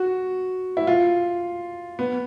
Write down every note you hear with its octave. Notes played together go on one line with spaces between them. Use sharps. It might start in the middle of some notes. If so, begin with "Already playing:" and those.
Already playing: F#4
E4
F4
B3